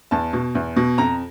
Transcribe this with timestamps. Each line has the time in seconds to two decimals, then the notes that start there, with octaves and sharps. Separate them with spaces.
0.11 E2 A5
0.33 B2
0.55 E2
0.76 B2
0.98 F2 A#5